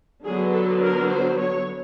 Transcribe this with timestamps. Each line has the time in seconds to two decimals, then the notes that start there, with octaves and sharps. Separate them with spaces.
0.24 D3 F#3 B3 G#4
0.53 A4
0.81 A#4
1.09 C5
1.38 C#5